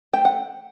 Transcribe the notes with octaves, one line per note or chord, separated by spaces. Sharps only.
A3 G5
F#5